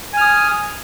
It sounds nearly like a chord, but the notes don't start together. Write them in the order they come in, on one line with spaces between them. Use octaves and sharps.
G#5 F6 D#6